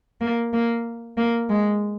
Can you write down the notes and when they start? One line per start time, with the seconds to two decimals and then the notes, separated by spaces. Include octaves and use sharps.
0.21 A#3
0.53 A#3
1.17 A#3
1.50 G#3